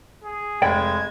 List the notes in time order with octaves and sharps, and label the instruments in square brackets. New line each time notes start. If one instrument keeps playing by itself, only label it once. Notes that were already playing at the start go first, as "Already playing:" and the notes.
[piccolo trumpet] G#4
[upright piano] F1 [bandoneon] G#3 [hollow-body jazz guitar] B4 D5 G5 [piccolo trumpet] G#6